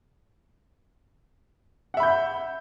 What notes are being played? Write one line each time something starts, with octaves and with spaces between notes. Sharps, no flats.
E5 F#5 B5 G6